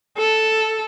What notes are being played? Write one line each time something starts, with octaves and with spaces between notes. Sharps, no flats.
A4